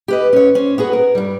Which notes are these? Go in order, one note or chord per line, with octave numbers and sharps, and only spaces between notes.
G4 B4 D#5
C#4 C#5
C#4 C5
B3 F#4 G#4
A#4
G2 G3